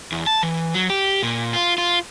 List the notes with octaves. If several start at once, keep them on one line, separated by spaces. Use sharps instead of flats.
E2
A5
E3
F#3
G4
A#2
F4
F4